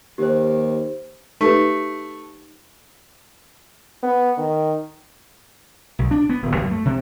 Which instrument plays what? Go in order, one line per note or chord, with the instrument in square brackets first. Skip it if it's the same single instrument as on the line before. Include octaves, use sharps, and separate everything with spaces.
[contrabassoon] D#2 [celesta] G4 C5
[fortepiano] A3 [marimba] D#4 G4 B4
[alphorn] B3
D#3
[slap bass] B1
D4
B3
D#1
F#2
A3
C3